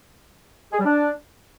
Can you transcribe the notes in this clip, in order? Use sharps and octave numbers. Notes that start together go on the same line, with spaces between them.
G#4
G3
D4